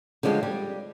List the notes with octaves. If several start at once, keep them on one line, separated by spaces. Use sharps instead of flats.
D3 F3 G3 G#3 C#4
G3